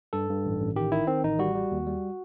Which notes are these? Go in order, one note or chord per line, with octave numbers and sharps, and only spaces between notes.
G2 A4
G2
A1
A1
D#3 G4
D#3 E4
D#3 C4
A1 D#4
G3 F#4
G3
D#2
G3